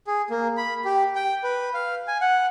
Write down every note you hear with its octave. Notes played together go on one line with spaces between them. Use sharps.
G#4
A#3
B5
G4
G5
B4
F5
G#5
F#5